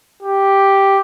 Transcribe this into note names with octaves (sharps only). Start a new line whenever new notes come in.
G4